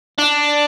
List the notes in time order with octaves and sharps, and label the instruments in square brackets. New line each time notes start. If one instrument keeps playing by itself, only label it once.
[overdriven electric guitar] D4